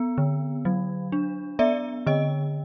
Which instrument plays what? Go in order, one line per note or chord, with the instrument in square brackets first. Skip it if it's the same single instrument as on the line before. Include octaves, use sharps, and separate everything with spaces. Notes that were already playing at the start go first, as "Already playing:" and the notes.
Already playing: [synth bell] B3
D3
F#3
D4
B3 D5 E5
D3 D#5